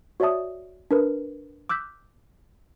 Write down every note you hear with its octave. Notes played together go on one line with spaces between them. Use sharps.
F#4 C#5 D5 E5 A5 D#6
D4 A#4 B4
D6 E6 F#6 G6 B6